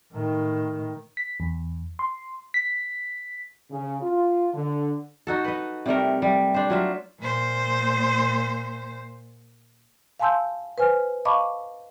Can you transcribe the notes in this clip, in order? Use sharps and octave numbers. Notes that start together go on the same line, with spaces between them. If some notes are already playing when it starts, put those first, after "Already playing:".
A2 D#3
B6
E2
C6
B6
C#3
F4
D3
D#4 F#4 A4
B4 D#5
C3 G3 A3 A#4
G3
D4 C5
F#3 F4 E5
A#2 C5
F5 G#5 A5 C6 E6 G6
B4 C5 G#5 F6
D#5 F5 A5 B5 C#6 D6